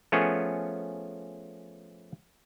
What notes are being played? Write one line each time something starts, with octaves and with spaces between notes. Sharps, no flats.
F3 A3 B3 C#4 G#4 C#5